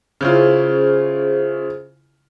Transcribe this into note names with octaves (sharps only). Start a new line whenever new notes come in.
C#3 C#4 E4 F4 G#4 C5